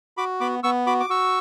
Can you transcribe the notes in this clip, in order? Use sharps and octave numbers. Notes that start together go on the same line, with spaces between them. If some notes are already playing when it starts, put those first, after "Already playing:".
F#4 B5 D6
B3 B5 D6
B3 C#6 E6
F#4 B5 D6
D6
F#4 C#6 E6